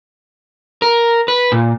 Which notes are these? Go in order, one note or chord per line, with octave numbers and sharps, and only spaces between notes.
A#4
B4
A#2